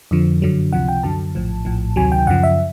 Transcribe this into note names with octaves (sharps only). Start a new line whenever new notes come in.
F2 D3 F3
F#2 D3 F#3
C#2 C3 F3 F#5
G5
F#2 D3 F#3 A5
A#1 A2 F3
A#1 A2 F3
D2 C3 D#3 F#3 G#5
G5
F#2 C#3 F3 F#5
E5